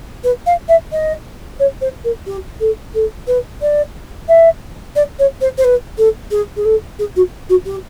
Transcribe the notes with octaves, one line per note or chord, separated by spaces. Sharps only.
B4
F5
E5
D#5
C#5
C5
A#4
G4
A4
A4
B4
D5
E5
D5
C#5
C5
C5
B4
A4
G#4
G#4
A4
G#4
F#4
F#4
G4